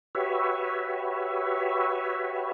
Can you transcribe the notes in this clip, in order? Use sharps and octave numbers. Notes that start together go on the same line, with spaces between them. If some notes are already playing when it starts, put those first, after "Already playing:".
F#4 G4 B4 C#5 E5